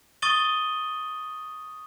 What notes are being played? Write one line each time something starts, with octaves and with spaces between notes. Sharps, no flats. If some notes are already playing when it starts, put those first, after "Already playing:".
C#6 D#6 A6 D#7 G7